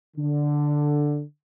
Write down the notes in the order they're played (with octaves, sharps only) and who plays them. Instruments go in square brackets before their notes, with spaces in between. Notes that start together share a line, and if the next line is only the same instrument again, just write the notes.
[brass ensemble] D3